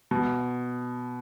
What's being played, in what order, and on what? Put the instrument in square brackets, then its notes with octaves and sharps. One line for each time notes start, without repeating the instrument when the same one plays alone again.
[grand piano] B2